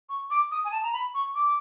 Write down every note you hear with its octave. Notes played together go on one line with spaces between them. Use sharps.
C#6
D6
D#6
G#5
A5
A#5
B5
C#6
D6